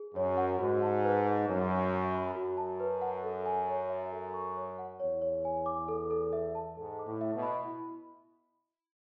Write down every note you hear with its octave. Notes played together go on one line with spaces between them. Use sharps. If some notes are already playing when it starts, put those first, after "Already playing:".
Already playing: G#4
F#2 C#5
F#5
G#2 F#4
A5
B4
F#5
F#2 C#5
C#5
E5
B5
F#2 F#4
A5
B4
F#5
A4
G#5
C#5
E5
A4
C#6
C#5
F#5
E2 C#5
C#5
G#5
D6
A4
A4
E5
A5
G#2 A4
D6
A2
E5
B2
B5
E4